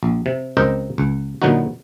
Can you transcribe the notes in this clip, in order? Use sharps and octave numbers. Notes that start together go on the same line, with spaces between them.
A#1
C3
C#2 C4 G4 A#4 D#5 G5
C#2
A#2 D3 F#3 B3 D#4 F#4